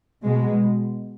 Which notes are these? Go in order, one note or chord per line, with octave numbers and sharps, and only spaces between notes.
B2 G#3